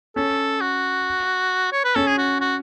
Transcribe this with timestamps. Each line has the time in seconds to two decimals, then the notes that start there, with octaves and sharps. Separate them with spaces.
0.16 C#4 A4
0.61 F#4
1.72 C#5
1.84 B4
1.96 C#4 A4
2.07 G#4
2.18 F#4
2.41 F#4